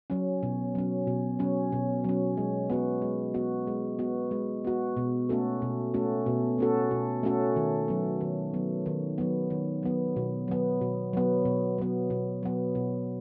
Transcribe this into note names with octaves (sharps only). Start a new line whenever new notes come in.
F#3 C#4
B2
F#3 C#4
B2
F#3 C#4
B2
F#3 C#4
G#3
B3 F#4
G#3
B3 F#4
G#3
B3 F#4
G#3
B3 F#4
B2
A3 C#4 F#4 A4
B2
A3 C#4 F#4 A4
B2
A3 C#4 F#4 A4
B2
A3 C#4 F#4 A4
D#3
F#3 B3
D#3
F#3 B3
D#3
F#3 B3
D#3
F#3 B3
B2
F#3 B3
B2
F#3 B3
B2
F#3 B3
B2
F#3 B3
B2